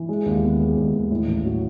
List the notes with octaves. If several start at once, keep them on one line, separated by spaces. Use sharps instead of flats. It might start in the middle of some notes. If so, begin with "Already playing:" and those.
Already playing: E3
G#3
D#2
B3
G#3
D#2
D#2
A2
A1
F#3